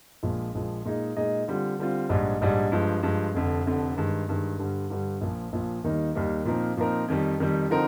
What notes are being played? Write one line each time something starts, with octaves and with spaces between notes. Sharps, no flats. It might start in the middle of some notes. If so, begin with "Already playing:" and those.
A#1 A#2 F3 G#3
A#1 A#2 F3 G#3
A#2 G#3 D#4 G#4 D#5
A#2 G#3 D#4 G#4 D#5
D3 G3 C4 F4
D3 G3 C4 F4
A#1 G#2 G3 D4
A#1 G#2 G3 D4
G2 F3 G#3
G2 F3 G#3
F1 F2 D3
F1 F2 D3
G2 D#3 G#3
G2 D#3 G#3
G2 D3 G3
G2 D3 G3
A#1 A#2 F3
A#1 A#2 F3
D#2 D#3 G3 A#3 D#4
D#2 D#3 G3 A#3 D#4
A#2 F3 C4 D#4 A#4
A#2 F3 C4 D#4 A#4
F2 D#3 G3
F2 D#3 G3
D3 F3 C4 D#4 A#4